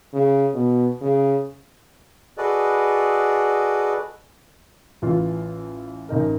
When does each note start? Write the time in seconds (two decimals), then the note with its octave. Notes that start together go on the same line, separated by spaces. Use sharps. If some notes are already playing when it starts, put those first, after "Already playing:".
0.13 C#3
0.54 B2
1.01 C#3
2.38 F#4 G#4 A4 B4 D5 D#5
5.02 A1 E3 F4
6.09 A1 D#4 A#4